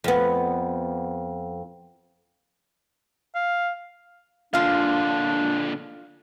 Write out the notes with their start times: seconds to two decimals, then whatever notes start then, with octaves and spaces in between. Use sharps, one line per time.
0.04 F2 B3
3.35 F5
4.54 A#2 D3 D4 F4 F5